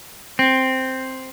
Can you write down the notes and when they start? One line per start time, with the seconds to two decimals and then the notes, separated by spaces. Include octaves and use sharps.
0.39 C4